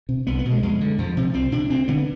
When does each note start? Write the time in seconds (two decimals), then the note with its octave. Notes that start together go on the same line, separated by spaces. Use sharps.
0.09 C3
0.27 C2 B3
0.39 B3
0.45 B2
0.51 G#3
0.63 F2 G#3
0.81 D3
0.98 F2 F3
1.17 C3
1.34 C2 C4
1.52 C3 D4
1.70 D2 C4
1.88 D3 B3